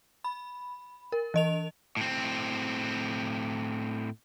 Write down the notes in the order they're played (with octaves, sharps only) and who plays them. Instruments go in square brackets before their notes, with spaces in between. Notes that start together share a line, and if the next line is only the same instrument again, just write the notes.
[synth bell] B5
A#4
E3 D#5 F7
[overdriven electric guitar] A2 C4